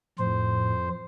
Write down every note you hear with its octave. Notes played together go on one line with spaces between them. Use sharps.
F2 A2 C5